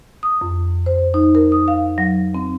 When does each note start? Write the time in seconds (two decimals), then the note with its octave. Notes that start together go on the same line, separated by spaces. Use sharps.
0.23 D#6
0.41 F2
0.86 C5
1.14 D#4
1.35 A#4
1.52 D#6
1.68 F5
1.98 F#3
2.35 C4